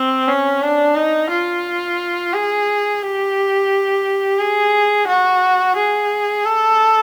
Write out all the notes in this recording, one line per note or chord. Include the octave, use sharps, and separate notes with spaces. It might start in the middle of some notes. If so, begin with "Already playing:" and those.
Already playing: C4
C#4
D4
D#4
F4
G#4
G4
G#4
F#4
G#4
A4